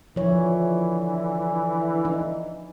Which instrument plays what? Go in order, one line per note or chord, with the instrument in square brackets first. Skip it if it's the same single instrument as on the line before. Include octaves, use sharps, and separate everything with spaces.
[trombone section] D3 E3 [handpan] F3 C#5
[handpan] D#4